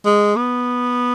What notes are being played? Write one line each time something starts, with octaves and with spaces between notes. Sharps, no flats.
G#3
B3